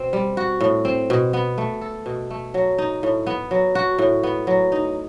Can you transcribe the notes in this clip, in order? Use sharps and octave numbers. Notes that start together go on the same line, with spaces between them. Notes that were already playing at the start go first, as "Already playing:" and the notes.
Already playing: B2 C4
G3
F#4
A2
C4
B2
B3
A3
A4
B2
A3
F#3
D#4
A2
B3
F#3
F#4
A2
B3
F#3
D#4